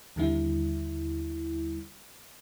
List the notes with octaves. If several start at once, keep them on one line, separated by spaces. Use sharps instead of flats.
D#2 D3 G3 E4